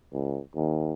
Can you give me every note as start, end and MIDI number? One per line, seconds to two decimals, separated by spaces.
0.13 0.39 37
0.55 0.94 39